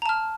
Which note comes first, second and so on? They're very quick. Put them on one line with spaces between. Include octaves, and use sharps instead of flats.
A#5 A5 F6